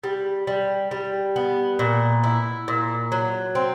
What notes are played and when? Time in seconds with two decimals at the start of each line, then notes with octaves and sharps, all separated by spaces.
0.04 G3
0.47 G3
0.91 G3
1.36 B3
1.79 A#2
2.24 E4
2.68 A#2
3.12 F#3
3.55 C4